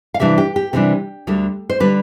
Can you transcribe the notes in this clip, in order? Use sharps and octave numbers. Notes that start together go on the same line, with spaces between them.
F5
C3 E3 G3 D4 E5
G4
G4
C3 E3 G3 D4 G4
D2 D3 G3
C5
D3 G3 B4